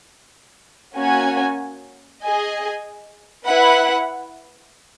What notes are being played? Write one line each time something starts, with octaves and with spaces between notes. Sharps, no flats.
A#3 C#4 F#4 C#5 G#5
G#4 D#5 G#5
E4 B4 F#5